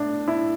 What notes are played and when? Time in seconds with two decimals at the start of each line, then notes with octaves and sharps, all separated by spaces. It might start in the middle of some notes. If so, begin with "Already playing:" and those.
Already playing: A2 D4
0.28 E4